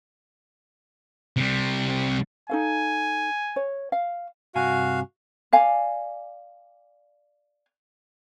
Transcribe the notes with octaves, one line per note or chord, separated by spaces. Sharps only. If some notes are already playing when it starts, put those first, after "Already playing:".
C3 G3
D#4 A4 F5 G#5
C#5
F5
G2 C3 F#4 F5 G#5
D5 F5 G#5